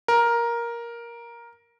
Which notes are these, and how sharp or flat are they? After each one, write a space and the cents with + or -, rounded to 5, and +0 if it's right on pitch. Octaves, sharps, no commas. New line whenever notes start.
A#4 +10